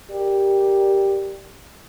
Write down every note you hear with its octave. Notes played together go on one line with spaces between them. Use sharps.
G4 A#4 D5